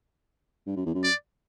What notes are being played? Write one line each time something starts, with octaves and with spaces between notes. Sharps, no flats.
G2
F#2
E2
F#2
D5